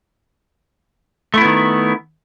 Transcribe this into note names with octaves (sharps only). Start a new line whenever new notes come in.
D#3 A3 B3 E4